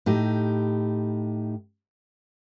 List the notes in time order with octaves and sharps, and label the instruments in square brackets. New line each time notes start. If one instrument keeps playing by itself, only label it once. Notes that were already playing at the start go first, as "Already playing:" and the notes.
[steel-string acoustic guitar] A2 D#4 G4